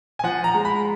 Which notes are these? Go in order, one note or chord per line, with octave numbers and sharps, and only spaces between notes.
G#5
F3 F#5
A#5
G#3
B5